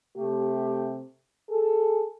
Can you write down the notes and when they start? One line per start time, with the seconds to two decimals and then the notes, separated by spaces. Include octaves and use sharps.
0.16 C3 A3 G4
1.50 G#4 A4